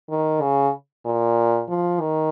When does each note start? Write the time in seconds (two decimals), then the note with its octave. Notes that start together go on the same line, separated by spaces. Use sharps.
0.10 D#3
0.41 C#3
1.06 A#2
1.69 F3
2.00 D#3